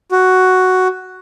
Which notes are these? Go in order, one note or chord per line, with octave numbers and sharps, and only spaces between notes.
F#4